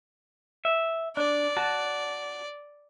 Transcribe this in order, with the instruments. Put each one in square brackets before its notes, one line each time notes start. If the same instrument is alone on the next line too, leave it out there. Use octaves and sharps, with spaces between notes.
[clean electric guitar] E5
[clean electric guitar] D4 [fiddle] D5
[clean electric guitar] F#4 A5